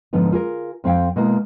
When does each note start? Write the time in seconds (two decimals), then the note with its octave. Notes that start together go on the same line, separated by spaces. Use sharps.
0.13 G#2 D3 F3 B3 D#4
0.32 F4 G#4 A#4
0.84 F2 C4 C5 F5 G5
1.16 B2 G#3 A#3 E4